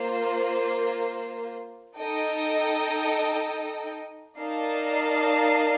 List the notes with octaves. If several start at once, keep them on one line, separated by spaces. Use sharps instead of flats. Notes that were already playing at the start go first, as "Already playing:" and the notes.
Already playing: A#3 F4 C5
D#4 A4 D#5 G5
D#4 A#4 D5 F5 A5